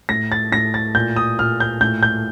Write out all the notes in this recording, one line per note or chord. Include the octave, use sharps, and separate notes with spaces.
A2 A#6
A6
A2 A#6
A6
A#2 G6
D#6
A#2 F6
G6
A2 G6
G6